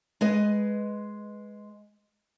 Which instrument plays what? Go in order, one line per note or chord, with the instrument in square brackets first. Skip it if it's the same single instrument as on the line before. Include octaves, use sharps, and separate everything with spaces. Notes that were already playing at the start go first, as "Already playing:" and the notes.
[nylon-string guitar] G#3 B4 D#5